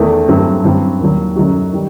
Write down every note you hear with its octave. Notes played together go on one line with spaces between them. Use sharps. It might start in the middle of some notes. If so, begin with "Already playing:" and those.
Already playing: E2 D#3 A3
G2 F#3 A3 C4
G2 F#3 C4
D#2 D#3 F#3
F#2 F#3 A3 D#4 F#4
D#3 G3